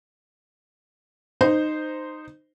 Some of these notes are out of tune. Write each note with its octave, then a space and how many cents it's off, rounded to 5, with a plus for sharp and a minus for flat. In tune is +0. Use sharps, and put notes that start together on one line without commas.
D#4 -15 C5 -10